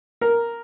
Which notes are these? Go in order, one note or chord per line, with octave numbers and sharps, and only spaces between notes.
A#4